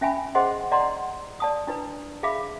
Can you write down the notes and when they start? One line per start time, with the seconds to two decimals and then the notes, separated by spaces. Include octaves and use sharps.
0.01 C#4 E5 G5 G#5 B5
0.35 G#4 C5 D#5 F#5 C6
0.72 D5 D#5 F#5 A#5 C6
1.40 D5 A5 D#6
1.67 D4 E4 B4
2.23 G#4 E5 F5 B5 D6